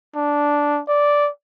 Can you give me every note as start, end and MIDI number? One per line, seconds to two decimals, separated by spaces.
0.15 0.81 62
0.88 1.30 74